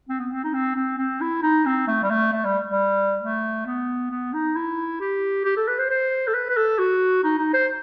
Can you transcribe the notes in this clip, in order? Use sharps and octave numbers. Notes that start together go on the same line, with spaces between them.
C4
B3
C4
D#4
C4
C4
C4
E4
D#4
C4
A3
G3
A3
A3
G3
G3
A3
B3
B3
D#4
E4
G4
G4
A4
B4
C5
C5
A4
B4
B4
A4
F#4
D#4
D#4
C5